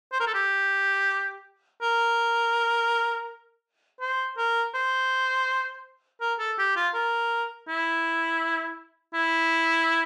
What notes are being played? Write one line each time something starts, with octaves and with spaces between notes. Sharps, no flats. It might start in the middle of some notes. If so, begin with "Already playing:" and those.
C5
A#4
A4
G4
A#4
C5
A#4
C5
A#4
A4
G4
F4
A#4
E4
E4